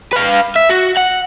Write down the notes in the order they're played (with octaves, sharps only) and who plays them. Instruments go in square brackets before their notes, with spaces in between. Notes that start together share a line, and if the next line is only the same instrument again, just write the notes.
[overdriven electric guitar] B4 F5
E5
F#4
F#5